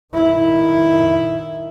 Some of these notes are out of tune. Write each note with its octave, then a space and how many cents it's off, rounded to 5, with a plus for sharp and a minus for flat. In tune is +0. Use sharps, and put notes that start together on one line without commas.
D#3 -5 E4 +0